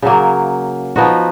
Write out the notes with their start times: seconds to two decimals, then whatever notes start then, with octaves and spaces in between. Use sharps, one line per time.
0.02 C#3 F#3 A#3
0.96 F3 B3 D#4 F#4